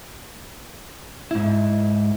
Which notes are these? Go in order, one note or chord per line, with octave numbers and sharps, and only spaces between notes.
G#2 E4